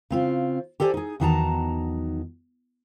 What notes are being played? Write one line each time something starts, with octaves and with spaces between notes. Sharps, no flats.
C#3 C4 F4
G4 A4 C5 D5 F5 G#5
D#4 G#4
E2 D#3 F#3 D#4 A5 A#5